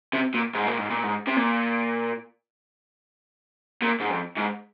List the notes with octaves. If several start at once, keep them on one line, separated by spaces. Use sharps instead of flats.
C3
A#2
G#2
A#2
G#2
A#2
G#2
C3
A#2
A#2
G#2
F2
G#2